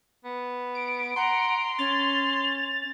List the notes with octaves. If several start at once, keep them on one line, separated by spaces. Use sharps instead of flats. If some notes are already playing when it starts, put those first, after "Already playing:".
B3
D7
F#5 A#5 C6
C#4 A6 F7